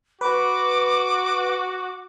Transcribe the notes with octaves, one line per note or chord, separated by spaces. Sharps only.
F#4 B4 D6